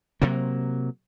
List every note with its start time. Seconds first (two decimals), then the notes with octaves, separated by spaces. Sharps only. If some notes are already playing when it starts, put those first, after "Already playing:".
0.22 C3 F#3 A#3